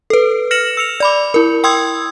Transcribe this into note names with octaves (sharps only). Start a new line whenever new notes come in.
A4 B4
F6 A#6 C#7 E7 F#7
E6 C#7 F7
D5 B5 D6
E4 A#4
G5 C6 D#6 E6 G#6